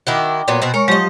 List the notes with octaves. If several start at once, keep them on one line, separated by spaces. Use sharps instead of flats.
D#3 E4 F#4 G5 D6
A#2 F#3 B3
B2 C4 F#4
G#3 A#4 C#5 C#6
F3 F#3 G4 D#5